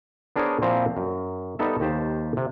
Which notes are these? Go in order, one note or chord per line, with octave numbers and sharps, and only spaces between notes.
B3 D4 G#4 A#4 C5 C#5
A#2 F3 C4 E4 A#5
F#2
G3 B3 D#4 A4 E5
D#2 D#3 G4 C5 A5
C3